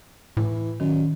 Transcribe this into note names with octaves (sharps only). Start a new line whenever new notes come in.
A2 E3
F#2 D#3